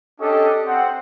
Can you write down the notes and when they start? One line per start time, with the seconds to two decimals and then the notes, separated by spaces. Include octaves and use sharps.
0.20 C#4 D4 G4 A4 D#5
0.67 C4 F#5